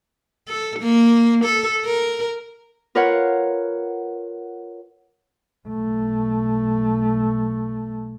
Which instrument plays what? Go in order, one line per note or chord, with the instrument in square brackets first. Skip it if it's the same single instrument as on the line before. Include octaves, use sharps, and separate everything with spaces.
[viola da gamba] A4
A#3
A4
A#4
[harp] F4 A#4 B4 C#5 F#5
[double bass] B1 A3